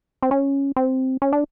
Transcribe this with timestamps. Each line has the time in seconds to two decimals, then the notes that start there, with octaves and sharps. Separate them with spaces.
0.22 C4
0.31 C#4
0.76 C4
1.22 C#4
1.33 D4